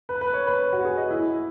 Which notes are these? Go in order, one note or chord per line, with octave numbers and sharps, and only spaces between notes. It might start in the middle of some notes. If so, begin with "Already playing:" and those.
B4
B4
C#5
B4
F#4
G#4
D#5
E4